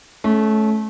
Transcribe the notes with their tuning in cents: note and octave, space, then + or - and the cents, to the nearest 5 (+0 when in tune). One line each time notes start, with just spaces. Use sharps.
A3 -25 C#4 +0